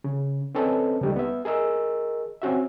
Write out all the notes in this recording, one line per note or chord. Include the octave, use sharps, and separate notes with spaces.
C#3
C4 C#4 A4 B4 D#5
C#2 G3 D#4
B3 E5
G#4 A#4 D#5 E6
C4 C#4 F#4 E5